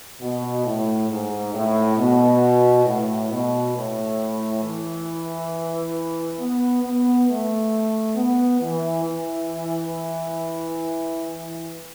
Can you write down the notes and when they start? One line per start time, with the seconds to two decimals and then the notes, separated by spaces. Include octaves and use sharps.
0.21 B2
0.66 A2
1.10 G#2
1.55 A2
1.98 B2
2.86 A2
3.30 B2
3.75 A2
4.62 E3
6.39 B3
6.83 B3
7.28 A3
8.16 B3
8.61 E3
9.04 E3